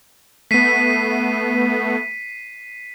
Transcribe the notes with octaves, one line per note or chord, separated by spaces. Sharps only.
A3 B3 B6 C7 D#7